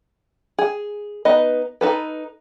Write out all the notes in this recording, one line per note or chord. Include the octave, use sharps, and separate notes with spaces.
G#4
B3 D#4 B4 D#5
D#4 A4 B4